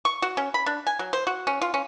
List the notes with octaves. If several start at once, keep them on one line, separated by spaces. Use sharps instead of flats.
C#6
F#4
C#4
B5
D4
G#5
F#3
C5
F#4
C#4
F4
C#4